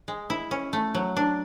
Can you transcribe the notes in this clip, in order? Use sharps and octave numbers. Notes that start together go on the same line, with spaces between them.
G#3
E4
C#4
A3
F#3
D4